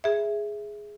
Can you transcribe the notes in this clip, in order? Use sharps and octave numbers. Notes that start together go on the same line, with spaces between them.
G#4 E5